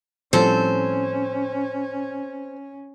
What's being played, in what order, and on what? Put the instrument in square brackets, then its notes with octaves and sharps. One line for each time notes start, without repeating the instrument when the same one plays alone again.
[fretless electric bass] A2 F3 G3 [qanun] C4 A4 [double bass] C#4 [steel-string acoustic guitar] C5